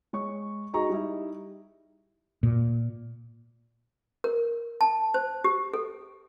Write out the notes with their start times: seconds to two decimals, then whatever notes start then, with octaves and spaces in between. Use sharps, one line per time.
0.13 G#3 C#5 C#6
0.73 D#4 F#4 G#4 D#5 A#5 C#6
0.90 G3 D#4 E4
2.43 A#2
4.24 A#4
4.81 A5
5.14 C5
5.44 G4
5.73 A4